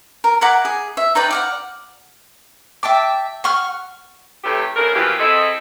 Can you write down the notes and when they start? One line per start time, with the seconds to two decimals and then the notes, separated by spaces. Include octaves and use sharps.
0.24 A#4
0.41 E4 A#4 F#5 D6
0.65 G#4
0.97 E5
1.15 D#4 B4 D5 G5
1.31 D5 F5 F#5
2.83 E5 G5 A5 D6
3.44 F#5 C#6 F6
4.44 A2 C3 E3 A3 G4
4.76 A2 C#3 D4 A#4
4.95 B2 E3 F3 A#3 F4 G4
5.19 C4 E4 G#4 A4 D#5